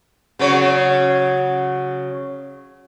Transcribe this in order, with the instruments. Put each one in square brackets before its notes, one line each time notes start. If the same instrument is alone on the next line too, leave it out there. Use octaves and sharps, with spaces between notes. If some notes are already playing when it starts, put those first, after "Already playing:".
[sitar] C#3 F#3 C#5